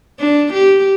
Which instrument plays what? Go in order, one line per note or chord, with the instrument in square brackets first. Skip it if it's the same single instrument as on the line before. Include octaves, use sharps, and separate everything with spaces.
[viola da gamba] D4
G4